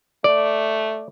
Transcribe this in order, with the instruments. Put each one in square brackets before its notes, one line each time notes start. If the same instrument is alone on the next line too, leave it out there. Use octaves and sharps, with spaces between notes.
[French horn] A3 [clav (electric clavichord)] D5